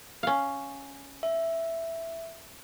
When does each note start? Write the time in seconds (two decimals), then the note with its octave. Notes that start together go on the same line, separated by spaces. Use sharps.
0.23 C#4 F5
1.23 E5